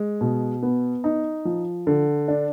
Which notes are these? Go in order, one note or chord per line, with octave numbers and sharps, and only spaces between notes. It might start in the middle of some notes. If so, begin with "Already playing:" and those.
Already playing: G#3
B2
B3
D#4
F3
D3
D4